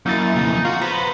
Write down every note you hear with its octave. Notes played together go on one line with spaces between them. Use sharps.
F#2 A#3 D#4 E4 A6
F2 C#3
F4 F#4 F#5
B3 B4 C5 A#5